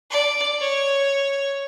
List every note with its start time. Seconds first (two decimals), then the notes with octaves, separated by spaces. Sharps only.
0.11 D5
0.60 C#5